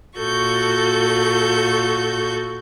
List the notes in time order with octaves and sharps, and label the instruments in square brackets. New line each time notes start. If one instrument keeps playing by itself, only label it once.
[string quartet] A#2 F#4 A4 C#6 G6